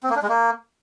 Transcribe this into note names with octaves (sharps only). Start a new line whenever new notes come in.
C4
A#3
D4
G#3
A#3